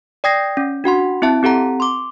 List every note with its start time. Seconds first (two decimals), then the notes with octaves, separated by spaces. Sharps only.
0.24 D5 G5 D#6 G#6 A#6 C7
0.57 C#4
0.84 D4 F#4 F#5 C6
1.22 C4 E4 E5 A5
1.43 C4 G4 A4 F#5 A#5
1.80 C6 D6